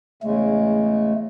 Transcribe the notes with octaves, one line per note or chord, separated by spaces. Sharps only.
E2 C#3 G#3 A3